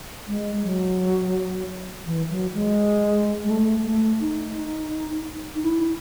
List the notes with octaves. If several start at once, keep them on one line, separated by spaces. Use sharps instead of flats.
G#3
F#3
E3
F#3
G#3
G#3
A3
A3
D#4
D#4
E4